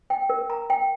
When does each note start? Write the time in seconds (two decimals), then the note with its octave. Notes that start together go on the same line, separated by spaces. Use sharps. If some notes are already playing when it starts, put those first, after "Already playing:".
0.10 G5
0.30 A#4
0.50 A#5
0.70 G5